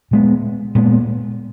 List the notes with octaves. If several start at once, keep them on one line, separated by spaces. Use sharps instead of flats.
A#2 G#3 B3
A#2 G#3 B3